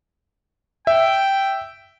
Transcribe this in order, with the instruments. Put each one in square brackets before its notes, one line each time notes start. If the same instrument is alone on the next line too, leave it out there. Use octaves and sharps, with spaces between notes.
[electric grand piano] E5 [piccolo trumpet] G5